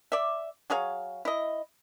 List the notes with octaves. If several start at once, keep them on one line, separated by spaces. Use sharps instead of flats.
D5 E5
F#3 G#4 C#5 F5
E4 D#5